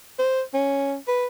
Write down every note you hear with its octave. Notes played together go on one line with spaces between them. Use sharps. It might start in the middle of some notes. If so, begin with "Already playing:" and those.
C5
C#4
B4